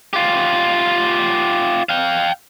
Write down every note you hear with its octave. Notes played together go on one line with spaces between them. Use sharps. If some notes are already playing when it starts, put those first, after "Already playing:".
F4 G4
F5 G5